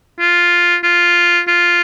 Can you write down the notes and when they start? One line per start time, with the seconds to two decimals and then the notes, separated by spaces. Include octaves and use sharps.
0.20 F4
0.84 F4
1.48 F4